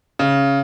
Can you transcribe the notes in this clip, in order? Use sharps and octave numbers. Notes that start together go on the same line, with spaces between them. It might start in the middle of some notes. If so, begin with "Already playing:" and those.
C#3